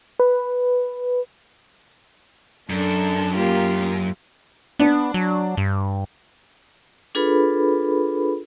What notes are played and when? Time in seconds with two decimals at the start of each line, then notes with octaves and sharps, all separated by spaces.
0.20 B4
2.70 F#2 D4 A4
3.35 A#3 F4 G4
4.79 B3 D4
5.14 F#3
5.57 G2
7.15 D4 F4 G#4 A4 B4 B5